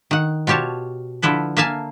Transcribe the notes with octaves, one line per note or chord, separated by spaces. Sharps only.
D#3 F#5
B2 F4 G4 C#5 A5
D3 F3 E4 A4 B4
A#3 E5 F5 G#5 A5